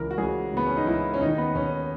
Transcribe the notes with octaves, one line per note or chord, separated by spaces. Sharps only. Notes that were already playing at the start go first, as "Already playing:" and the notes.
Already playing: C#2 C#3 E3 A#4
F#4
C#2 C#3 E3 G#4
C#2 C#3 E3 B3
C#4
D#4
C#2 C#3 E3 E4
C#4
D#2 D#3 D#4
B3
D#2 D#3 C#4